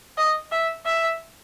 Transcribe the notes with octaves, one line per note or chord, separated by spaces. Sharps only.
D#5
E5
E5